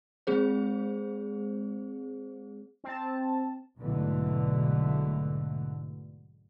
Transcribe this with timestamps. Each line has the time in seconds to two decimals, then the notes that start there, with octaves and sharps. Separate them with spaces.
0.27 G#3 C4 G#4 C5
2.84 C4 A5
3.79 B1 G#2 B2 D3 E3 A3